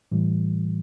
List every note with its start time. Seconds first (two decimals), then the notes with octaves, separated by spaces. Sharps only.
0.12 A2 E3 G3